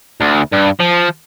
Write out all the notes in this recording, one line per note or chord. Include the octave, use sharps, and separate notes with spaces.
D2
G2
F3